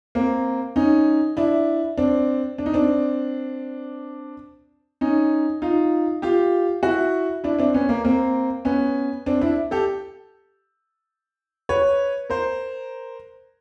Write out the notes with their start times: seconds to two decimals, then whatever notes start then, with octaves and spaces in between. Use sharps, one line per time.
0.15 A#3 C4
0.76 C#4 D#4
1.37 D4 E4
1.97 C4 D4
2.58 D4
2.66 D#4
2.73 C4 D4
5.01 C#4 D#4
5.62 D#4 F4
6.22 F4 G4
6.83 E4 F#4
7.44 D4 E4
7.59 C4 D4
7.74 B3 C#4
7.89 A#3
8.05 A#3 C4
8.65 B3 C#4
9.26 C4 D4
9.41 D4 E4
9.71 G4 A4
11.69 B4 C#5
12.30 A#4 C5